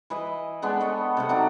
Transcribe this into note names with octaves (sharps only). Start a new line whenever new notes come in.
E3 B4 D#5
G#3 B3 D4 A4
A4 C#5 D#5 G5
C3 A3 F#5
F#3 D4 D#4